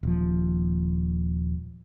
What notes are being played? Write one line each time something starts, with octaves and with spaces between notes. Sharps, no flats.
D#1 F3